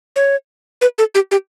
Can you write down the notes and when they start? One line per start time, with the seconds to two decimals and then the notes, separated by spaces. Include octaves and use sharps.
0.16 C#5
0.81 B4
0.98 A4
1.15 G4
1.31 G4